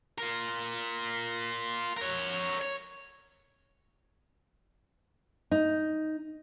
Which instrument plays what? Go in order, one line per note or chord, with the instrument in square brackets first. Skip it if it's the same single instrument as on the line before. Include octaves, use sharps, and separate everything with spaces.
[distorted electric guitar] F4 A#4
A#4 C#5
C#5
[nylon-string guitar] D#4